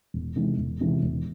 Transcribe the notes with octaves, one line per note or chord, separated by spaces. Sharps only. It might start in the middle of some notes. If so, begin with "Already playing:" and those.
E1
E2 C3 D#3 G#3
E1
E2 C3 D#3 G#3
E1